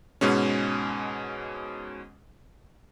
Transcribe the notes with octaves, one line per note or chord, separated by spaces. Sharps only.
G#2 B2 G#3 C#4